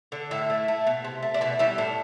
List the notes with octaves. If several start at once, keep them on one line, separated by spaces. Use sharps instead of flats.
D3
A2 E4
A3
A3
B2
C3
A3
D4
B2 E4
G3 E4
A2 D4